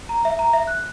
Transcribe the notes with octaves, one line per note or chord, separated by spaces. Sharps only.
A#5
E5
A#5
E5
F#6